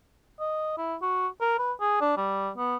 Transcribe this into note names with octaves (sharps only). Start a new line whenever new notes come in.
D#5
E4
F#4
A#4
B4
G#4
D4
G3
B3